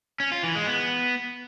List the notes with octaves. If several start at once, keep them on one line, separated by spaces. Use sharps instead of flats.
C#4
F4
E3
G#3
B3